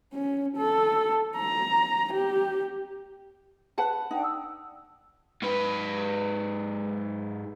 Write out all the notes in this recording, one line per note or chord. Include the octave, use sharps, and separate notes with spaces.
C#4
A4
A#5
G4
B4 F#5 A5
D4 D#4 F#5 G5
D#6 E6
G#2 B4